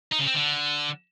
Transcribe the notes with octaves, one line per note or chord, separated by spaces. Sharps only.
D#4
C#3
C4
D3